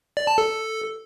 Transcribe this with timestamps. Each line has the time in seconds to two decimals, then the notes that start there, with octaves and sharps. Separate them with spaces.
0.17 D5
0.27 A5
0.38 A4